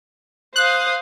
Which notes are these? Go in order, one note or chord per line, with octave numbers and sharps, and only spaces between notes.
C5 F5 D#6 F#6